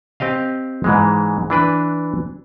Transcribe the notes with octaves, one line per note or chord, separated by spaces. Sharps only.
C4 G4 D#5 F5
G#2 E3 G#3
E3 D4 B4